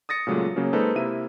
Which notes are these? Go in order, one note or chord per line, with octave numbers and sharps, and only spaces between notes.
D#6 A6 A#6 C#7
A#2 C#3 F#3 G#3 A3
C#3 F#3 A#3 C#4
G#3 A#3 D#4 A4 B4 C5
C3 A#3 E4 E5 D#7